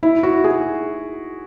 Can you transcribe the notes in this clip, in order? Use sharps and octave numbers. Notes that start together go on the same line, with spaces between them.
E4
F#4
G#4